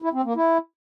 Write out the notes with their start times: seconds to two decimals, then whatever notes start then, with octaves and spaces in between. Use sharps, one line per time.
0.02 E4
0.13 C4
0.25 A#3
0.36 E4